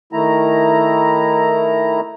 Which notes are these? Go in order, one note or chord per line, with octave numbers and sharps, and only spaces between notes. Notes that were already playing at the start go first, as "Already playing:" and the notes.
D#3 A3 E4 A#5